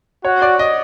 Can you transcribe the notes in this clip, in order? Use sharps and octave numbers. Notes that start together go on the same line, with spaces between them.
F#4 C#5
D5
D#5